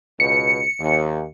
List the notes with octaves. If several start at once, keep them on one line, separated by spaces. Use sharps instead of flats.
C#2 B2 C#7
D#2